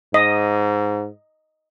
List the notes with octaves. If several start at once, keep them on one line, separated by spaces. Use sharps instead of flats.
G#2 D#5